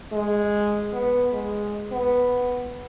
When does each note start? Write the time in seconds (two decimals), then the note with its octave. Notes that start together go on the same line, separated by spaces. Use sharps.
0.12 G#3
0.93 B3
1.33 G#3
1.92 B3